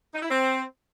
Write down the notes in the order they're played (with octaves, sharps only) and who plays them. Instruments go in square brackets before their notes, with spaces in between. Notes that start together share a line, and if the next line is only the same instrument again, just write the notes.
[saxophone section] D#4
E4
C4